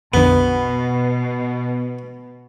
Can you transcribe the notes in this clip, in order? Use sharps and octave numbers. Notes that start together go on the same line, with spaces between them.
A#1 F2 B2 D3 B3